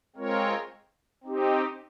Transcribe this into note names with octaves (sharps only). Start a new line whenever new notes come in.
G#3 C4 F4 A#4 C#5
C4 D#4 G4